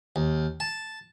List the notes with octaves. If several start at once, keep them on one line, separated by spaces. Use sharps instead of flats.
D#2
A5